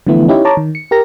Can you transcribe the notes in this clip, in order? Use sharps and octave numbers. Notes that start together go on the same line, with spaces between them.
D3 E3 F3 A3 B3 E4
C#4 D#4 E4 G4 C#5
C#5 A5 A#5 D6
D#3
C#7
G4 A#4 A#6